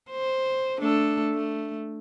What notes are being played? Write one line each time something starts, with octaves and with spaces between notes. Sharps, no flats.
C5
A3 D4 A4
A3